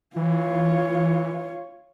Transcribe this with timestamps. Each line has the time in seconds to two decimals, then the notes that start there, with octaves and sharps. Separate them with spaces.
0.16 E3 F4 C#5